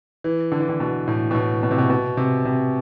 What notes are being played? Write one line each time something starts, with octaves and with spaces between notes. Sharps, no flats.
E3
D3
E3
D3
B2
A2
B2
A2
B2
C3
B2
B2
C3
C3